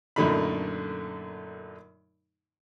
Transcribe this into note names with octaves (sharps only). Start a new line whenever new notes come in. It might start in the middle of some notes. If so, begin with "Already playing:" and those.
F#2 A#2 D3 A3 D#4 B5